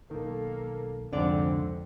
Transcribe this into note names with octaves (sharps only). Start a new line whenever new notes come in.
B1 D#3 A#3 A4
C2 F2 G#2 D3 C4 D5